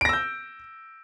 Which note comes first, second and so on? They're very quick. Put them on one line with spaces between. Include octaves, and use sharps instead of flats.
D7 A#6 E6 G6